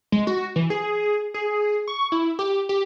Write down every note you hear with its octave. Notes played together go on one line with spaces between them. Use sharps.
G#3
F#4
E3
G#4
G#4
C#6
E4
G4
G4